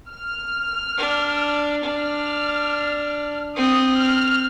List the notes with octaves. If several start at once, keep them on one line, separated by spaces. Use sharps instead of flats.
F6
D4
D4 F6
C4 D#6
F6